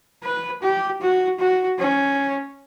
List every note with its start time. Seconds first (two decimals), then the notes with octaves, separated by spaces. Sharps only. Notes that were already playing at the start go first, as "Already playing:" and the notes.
0.23 B4
0.62 G4
1.01 F#4
1.39 F#4
1.78 C#4